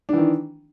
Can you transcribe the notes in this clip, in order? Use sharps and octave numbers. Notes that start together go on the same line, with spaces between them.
D#3 E3 D4